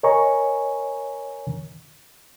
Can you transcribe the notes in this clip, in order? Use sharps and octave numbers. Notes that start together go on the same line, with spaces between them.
A#4 C#5 D#5 G#5 A#5 C#6